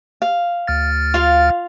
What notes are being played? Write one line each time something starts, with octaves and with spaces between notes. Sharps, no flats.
F5
D2 F6 A6
F4 F5